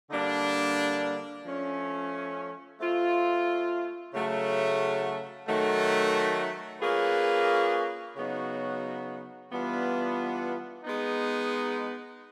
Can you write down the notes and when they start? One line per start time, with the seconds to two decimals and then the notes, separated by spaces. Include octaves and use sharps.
0.10 D3 G3 A#3 D4
1.44 F3 A3 C#4
2.79 A3 C4 F4
4.13 C#3 F#3 A3
5.48 D#3 F#3 A3
6.81 A#3 C#4 F4 G#4 B4
8.16 C#3 F#3 B3 D#4 F#4
9.50 E3 G3 B3 D4 F4
10.84 G#3 B3 D#4